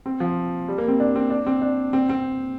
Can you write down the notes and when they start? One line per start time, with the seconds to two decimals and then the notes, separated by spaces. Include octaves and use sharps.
0.06 C4
0.20 F3
0.68 G3
0.78 A#3
0.88 C4
1.00 D4
1.16 C4
1.30 D4
1.46 C4
1.62 D4
1.93 C4
2.09 C4